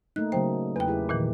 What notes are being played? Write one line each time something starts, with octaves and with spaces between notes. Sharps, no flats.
A3 A#3 D#4 F#6
C#3 F#3 A#3 C5 G5
E2 B4 G5
E4 G4 G#4
A#2 D#3 E3